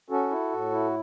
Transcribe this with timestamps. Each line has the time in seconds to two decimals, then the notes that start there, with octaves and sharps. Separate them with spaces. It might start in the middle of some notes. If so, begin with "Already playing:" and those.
0.10 C#4 F#4 A4
0.30 E4
0.51 A2
0.72 E4